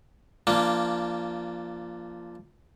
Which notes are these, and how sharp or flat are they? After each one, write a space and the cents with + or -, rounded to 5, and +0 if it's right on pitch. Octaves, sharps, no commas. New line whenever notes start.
F3 -20 A#3 +0 D4 +0